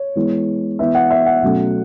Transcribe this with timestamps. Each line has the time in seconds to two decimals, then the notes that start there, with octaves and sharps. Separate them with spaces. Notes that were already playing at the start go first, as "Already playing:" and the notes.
Already playing: C#5
0.16 E3 G#3 B3
0.79 E3 B3 E5
0.95 F#5
1.11 E5
1.26 F#5
1.42 B2 F#3 A3 C#4